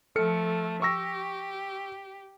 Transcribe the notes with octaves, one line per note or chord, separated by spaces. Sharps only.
F3 A3 A4 F6 C#7
G4 C#6 E6 A#6